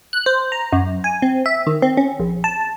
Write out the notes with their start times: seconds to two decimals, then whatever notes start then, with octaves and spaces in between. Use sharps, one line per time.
0.13 F#6
0.26 C5
0.52 A#5
0.73 F#2
1.04 G#5
1.22 C4
1.46 E5
1.67 D#3
1.82 C4
1.97 C#4
2.20 A#1
2.44 A5